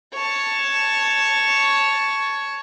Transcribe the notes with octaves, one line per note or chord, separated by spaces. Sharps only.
C#5 A5